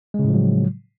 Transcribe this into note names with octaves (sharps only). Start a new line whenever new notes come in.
A2 C#3 F3 F#3 G#3